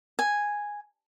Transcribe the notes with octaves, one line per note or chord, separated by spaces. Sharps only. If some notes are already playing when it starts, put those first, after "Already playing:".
G#5